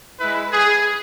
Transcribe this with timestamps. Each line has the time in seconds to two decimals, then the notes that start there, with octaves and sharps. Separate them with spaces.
0.19 G#3 E4 B4
0.51 G#4